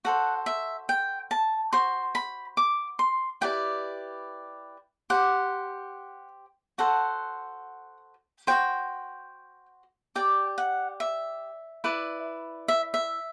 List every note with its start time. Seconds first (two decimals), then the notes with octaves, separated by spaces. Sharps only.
0.05 F#4 A4 C5 F#5
0.46 E5
0.89 G5
1.31 A5
1.73 F#4 C5 C6
2.15 B5
2.57 D6
2.99 C6
3.41 E4 G4 B4 D5 G5
5.10 G4 C5 F#5
6.78 F#4 A4 C5 F#5
8.47 F#4 C5 G5
10.15 G4 D5 G5
10.58 F#5
11.00 E5
11.84 E4 B4 D5
12.68 E5
12.94 E5